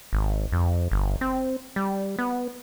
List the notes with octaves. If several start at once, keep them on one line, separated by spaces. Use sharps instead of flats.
G#1
F2
G1
C4
G3
B3